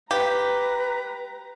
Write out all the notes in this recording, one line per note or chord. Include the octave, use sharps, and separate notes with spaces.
G4 B4 A#5